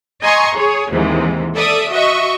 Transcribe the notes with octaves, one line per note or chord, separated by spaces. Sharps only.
D#5 G#5 A#5 C6 C#6
G#4 C#5
D#2 G#2 C3 E3
A4 D5 E5 D#6
F#4 D#5 E5 C#6